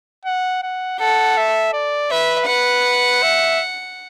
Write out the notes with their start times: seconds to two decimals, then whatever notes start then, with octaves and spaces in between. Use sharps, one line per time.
0.25 F#5
0.63 F#5
0.99 A4 F#5
1.37 E5
1.73 D5
2.11 B4 E5
2.48 B4 F#5
3.23 E5